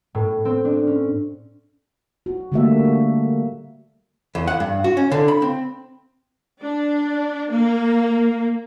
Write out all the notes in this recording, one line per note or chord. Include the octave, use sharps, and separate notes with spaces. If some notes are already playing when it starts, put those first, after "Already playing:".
A2
C4
D4
C#4
F#4
D3 G3 A3 A#3 F#4 E5
E2
F#5
G2
F#4
C#4
D3
B5
C4
D4
A#3